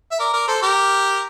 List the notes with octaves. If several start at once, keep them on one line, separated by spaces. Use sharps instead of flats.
E5
A#4 D5
A#4 D5
A4 C5
G4 A#4